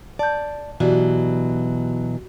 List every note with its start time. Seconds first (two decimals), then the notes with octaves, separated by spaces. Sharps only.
0.19 D5 A5 G6
0.80 B2 E3 F#3 F#4 G4 D5